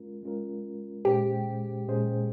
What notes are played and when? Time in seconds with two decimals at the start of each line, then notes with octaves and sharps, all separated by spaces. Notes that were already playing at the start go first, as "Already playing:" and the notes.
Already playing: G#3 C#4 F4 A#4
0.23 G#3 C#4 F4 A#4
1.05 A#2 G#3 C#4 G4 G#4 C5
1.88 A#2 G#3 C#4 G#4 C5